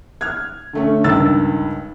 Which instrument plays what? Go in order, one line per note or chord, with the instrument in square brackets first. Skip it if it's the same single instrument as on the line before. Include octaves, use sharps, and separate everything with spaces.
[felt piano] F6 G#6
D3 A3 C#4
C#2 G2 D#3 E6 A6